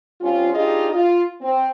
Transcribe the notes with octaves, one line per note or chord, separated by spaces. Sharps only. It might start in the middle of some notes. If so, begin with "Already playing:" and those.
G3 C4 C#4 F4
D4 D#4 F4 G4 G#4 D#5
F4
C4